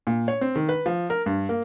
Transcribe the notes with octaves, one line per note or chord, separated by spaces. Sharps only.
A#2
C#5
C4
D#3
B4
F3
A#4
G2
A#3